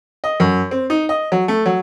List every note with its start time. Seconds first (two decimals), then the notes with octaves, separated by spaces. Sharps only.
0.24 D#5
0.40 F#2
0.71 C4
0.90 D#4
1.09 D#5
1.32 F#3
1.48 A3
1.66 F#3